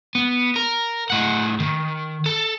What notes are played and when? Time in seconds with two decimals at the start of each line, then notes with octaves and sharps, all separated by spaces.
0.15 B3
0.56 A#4
1.10 A2 F#5
1.60 D#3
2.26 A4